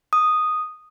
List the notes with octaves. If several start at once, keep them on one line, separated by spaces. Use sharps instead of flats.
D#6